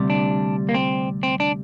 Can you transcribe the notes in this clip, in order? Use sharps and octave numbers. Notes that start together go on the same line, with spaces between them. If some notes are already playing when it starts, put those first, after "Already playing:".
Already playing: D2 C3 G3
D4
A#3
C4
C4
D4